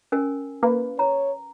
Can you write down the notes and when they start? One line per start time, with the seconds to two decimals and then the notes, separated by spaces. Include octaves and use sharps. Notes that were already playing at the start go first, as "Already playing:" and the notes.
0.12 C#4 A#4 G#5
0.63 A#3 B4
0.99 C#5 A#5